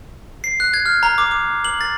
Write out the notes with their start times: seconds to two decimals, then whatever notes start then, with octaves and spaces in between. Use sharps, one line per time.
0.44 C7
0.60 F#6
0.74 G#6
0.86 F6
1.03 A#5
1.18 D6
1.31 D6
1.65 F#7
1.81 A6